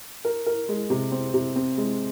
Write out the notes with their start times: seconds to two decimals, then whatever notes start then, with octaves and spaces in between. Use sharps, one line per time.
0.25 A#4
0.46 A#4
0.69 G#3
0.90 C3
1.12 C4
1.34 C3
1.56 C4
1.78 G#3